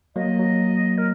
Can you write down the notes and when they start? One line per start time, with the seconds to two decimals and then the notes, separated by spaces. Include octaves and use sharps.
0.16 F#3 A#3 D#5
0.39 F#3
0.98 A#4